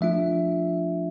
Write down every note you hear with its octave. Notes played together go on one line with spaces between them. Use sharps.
F3 A3 D4 F4 E5